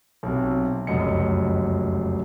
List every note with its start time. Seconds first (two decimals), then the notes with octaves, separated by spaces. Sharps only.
0.23 B1 C3
0.87 F1 C#2 F#2 D#5 C#7